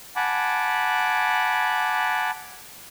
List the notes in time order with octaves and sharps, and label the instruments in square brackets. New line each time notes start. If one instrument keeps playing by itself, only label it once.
[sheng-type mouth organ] F#5 G#5 A5 B5 D6